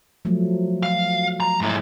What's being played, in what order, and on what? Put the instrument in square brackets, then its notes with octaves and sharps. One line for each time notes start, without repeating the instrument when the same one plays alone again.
[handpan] F3 F#3 A3
[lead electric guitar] F5
A#5
G#2 E4